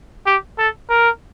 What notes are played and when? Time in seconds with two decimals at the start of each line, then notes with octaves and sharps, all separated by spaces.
0.26 G4
0.59 A4
0.90 A#4